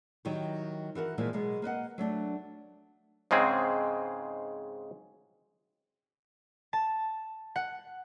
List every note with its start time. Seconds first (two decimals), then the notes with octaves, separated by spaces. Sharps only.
0.25 D#3 F#3 D#4 E4 G4
0.95 E3 F#4 A#4 F#5
1.18 A#2 E3 F3 G#3 A#3
1.33 B2 F#3 G#3 B3
1.62 A#3 B4 D#5 F#5
1.98 F#3 A3 D4
3.31 G#2 C#3 G#3 C4 G#4
6.73 A5
7.56 F#5